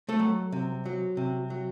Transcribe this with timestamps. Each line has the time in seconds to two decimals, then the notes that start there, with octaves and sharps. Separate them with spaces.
0.09 A3 A4
0.19 F#3
0.52 C3
0.85 F#3
1.17 C3
1.50 F#3